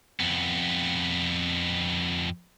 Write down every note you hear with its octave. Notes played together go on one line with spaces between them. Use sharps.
F2 B3